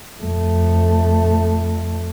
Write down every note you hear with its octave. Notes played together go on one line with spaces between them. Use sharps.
F2 A3